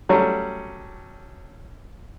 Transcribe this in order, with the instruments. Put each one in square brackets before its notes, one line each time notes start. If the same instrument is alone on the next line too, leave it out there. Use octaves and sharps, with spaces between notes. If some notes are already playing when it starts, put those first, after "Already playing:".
[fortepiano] F#3 G3 A3 C#4